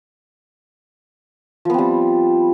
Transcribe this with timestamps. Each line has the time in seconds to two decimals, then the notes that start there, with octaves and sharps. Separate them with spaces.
1.65 F3
1.70 B3
1.74 C4
1.78 G3